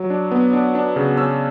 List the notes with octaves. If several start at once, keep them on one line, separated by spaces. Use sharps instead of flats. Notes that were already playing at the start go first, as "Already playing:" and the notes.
Already playing: F#3
D4
B3
D4
D4
C#3
C#4 E6